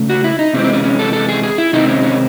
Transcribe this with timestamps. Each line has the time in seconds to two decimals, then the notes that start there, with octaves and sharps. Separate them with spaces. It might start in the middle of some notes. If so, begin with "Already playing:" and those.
Already playing: C#3 A3
0.09 F#4
0.24 E4
0.39 D#4
0.54 C3 E3 G#3 C4 C#4
0.64 C4
0.73 C#4
0.84 C#4
0.99 A4
1.13 A4
1.29 G#4
1.43 G#4
1.58 E4
1.73 C3 D#3 G#3 C4 D#4
1.88 C#4
2.03 C#4